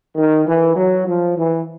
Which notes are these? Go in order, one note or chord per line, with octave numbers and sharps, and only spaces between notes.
D#3
E3
F#3
F3
E3